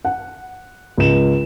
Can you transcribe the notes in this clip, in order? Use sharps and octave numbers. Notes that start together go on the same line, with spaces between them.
F#5
C#2 E7